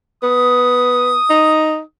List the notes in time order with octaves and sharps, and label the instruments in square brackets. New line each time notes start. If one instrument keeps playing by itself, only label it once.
[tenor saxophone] B3 [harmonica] D#6
[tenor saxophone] D#4